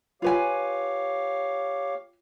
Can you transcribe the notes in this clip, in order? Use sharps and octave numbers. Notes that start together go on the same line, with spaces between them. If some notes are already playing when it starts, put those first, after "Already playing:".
F4 G4 B4 C#5 F5 G#5